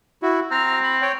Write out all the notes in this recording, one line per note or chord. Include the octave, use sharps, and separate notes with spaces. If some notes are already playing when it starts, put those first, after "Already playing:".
E4 F#4
C4 A#5 F6
B5
C#5 G5